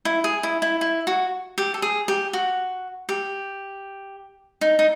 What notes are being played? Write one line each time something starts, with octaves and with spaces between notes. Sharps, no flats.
E4
G#4
E4
E4
E4
F#4
G4
A4
G#4
G4
F#4
G4
D#4
D#4